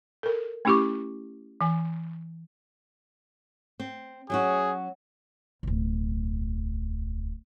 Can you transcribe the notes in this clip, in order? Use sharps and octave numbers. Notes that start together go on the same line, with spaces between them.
A4 A#4
A3 C#4 E4 G4 C#6 D6
E3 G#5
C4
F#3 C#4 F#4 G#4
D1 B1